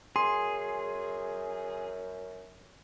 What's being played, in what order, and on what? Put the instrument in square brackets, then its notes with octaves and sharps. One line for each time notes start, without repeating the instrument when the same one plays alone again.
[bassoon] F#2 [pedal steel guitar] G#4 [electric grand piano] C6